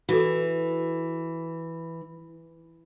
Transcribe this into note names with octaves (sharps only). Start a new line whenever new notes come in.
E3 F#4 A4